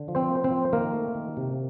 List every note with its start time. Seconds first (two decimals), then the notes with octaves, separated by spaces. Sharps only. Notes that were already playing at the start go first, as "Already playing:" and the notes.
Already playing: D3
0.08 F3
0.15 C4 C5
0.30 A#3
0.44 C4 C5
0.50 F3
0.73 D#3 A#3 A#4
0.93 A3
1.15 D#3
1.37 C3